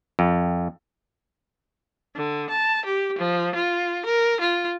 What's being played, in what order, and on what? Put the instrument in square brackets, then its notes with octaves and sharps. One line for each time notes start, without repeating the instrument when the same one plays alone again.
[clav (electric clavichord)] F2
[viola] D3
A5
G4
F3
F4
A#4
F4